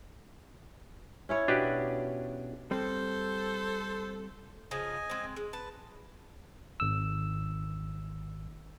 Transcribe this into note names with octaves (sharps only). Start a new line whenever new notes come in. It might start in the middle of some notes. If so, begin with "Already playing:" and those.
C#4 E4 C#5
B2 D4 G4 B4
G3 C4 A4 C5
C#3 F3 D#5 G#5
G#3 C4
G#3
B4 A5
G#1 E6